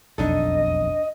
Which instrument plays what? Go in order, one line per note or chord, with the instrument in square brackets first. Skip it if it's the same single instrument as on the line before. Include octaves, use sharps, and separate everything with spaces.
[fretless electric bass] E1 B1 F2 [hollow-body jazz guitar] D4 D#4 A4 [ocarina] D#5